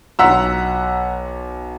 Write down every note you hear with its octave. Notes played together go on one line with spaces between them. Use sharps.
B1 F#5 A#5 C6 E6 B6